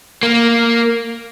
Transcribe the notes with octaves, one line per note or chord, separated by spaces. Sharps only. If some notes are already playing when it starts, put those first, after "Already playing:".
A#3